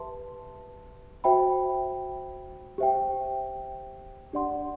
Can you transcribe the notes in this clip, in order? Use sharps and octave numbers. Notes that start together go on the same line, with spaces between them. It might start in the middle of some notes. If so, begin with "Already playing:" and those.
Already playing: G4 B4 E5 A5 C6
F#4 C5 E5 G5 B5
G4 C5 E5 G5
D4 G4 D5 F#5 C6